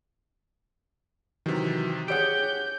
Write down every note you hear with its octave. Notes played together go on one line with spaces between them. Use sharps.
C3 D#3 E3 F#3
G4 G#4 C#5 F#5 G6 D7